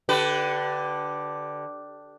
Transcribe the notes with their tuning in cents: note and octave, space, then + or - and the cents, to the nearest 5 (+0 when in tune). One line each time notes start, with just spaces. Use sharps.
D3 +0 G4 -25 B4 +20